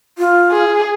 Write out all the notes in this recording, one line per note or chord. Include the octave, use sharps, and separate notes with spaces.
F4
G#4